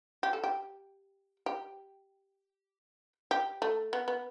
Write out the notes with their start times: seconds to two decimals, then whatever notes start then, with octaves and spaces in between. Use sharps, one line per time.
0.23 G4
0.33 A4
0.44 G4
1.46 G4
3.31 G4
3.62 A3
3.93 B3
4.08 B3